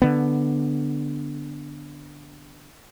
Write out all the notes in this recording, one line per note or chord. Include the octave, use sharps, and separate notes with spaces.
D3 B3